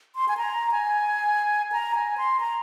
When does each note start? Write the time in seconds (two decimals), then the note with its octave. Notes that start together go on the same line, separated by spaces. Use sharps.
0.16 C6
0.28 G#5
0.37 A#5
0.71 G#5
1.72 A#5
1.95 G#5
2.17 C6
2.40 A#5